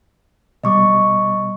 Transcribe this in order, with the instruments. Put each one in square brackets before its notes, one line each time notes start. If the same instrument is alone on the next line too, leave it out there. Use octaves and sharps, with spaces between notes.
[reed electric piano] B2 G3 [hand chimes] D#5 C#6 D6